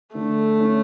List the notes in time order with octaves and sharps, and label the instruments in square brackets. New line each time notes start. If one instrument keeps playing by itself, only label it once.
[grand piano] D3 [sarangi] A3
[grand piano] C#4